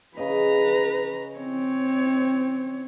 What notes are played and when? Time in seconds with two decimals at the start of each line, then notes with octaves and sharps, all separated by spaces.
0.17 C#3 B4 D#5 A#5
1.38 C4 C#5